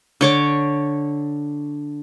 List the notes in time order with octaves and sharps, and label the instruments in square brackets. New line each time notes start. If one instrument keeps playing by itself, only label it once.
[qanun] D3 C#5 D6